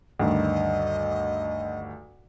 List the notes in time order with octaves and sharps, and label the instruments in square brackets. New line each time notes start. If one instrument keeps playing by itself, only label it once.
[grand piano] D2 G2 D#3 [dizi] D#5